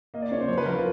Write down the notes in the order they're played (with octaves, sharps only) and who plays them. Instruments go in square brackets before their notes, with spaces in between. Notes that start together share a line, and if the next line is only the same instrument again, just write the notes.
[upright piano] A#3 [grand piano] D#5
[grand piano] D5
[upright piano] C#3 [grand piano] C#5
[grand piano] C5
[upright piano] F3 [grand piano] C#5
[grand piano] B4
[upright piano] F3 [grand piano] A#4
[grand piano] F4